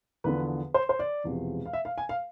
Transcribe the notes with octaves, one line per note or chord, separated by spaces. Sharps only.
E2 D3 F3 B3 B4
C5
C5
D5
E1 E2 C3 F3 G#3
F5
E5
F5
G#5
F5